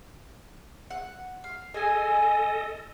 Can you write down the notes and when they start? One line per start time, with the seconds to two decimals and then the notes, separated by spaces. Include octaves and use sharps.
0.90 F#5
1.44 F5
1.74 G#4 A4 D#5 G#5